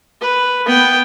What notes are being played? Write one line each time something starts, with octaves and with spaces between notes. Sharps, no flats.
B4
B3 G5